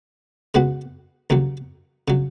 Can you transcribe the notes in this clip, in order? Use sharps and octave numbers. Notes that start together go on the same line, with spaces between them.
C#3 G#3 B3 F#4
D#2 C#3 F#3
C#3 F#3